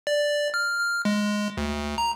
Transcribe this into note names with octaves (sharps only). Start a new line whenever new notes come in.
D5
F6
F6
G#3
D2
A#5